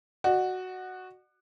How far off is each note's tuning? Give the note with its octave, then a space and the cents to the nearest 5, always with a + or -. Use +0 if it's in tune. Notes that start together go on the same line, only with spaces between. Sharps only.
F#4 +0 D5 +45